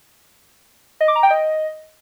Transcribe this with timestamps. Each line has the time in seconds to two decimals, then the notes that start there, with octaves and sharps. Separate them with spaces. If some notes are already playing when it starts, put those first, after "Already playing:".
1.01 D#5
1.08 D6
1.15 A#5
1.23 G5
1.30 D#5